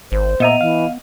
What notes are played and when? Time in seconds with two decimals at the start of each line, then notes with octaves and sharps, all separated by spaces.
0.12 G#1 C5
0.40 A#2 B3 D#5 E5 A#5 D#7 F7
0.61 E3 F5